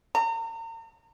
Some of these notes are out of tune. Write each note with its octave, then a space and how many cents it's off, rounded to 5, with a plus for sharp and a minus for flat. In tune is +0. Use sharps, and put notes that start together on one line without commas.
A#5 -40